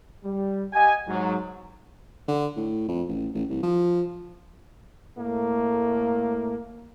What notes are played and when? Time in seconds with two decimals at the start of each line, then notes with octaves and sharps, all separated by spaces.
0.24 G3
0.73 G4 D#5 F#5 G#5
1.07 G#2 F#3
2.28 D3
2.56 A2
2.88 F2
3.08 A1
3.34 A1
3.50 C2
3.63 F3
5.17 A2 A3 A#3